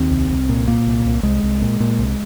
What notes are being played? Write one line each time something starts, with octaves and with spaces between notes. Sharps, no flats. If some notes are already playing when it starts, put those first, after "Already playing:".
Already playing: D#2 C4
C2
C2
A#2
A#2 A#3
C2
C2
C2 G#3
C2
A#2
A#2
C2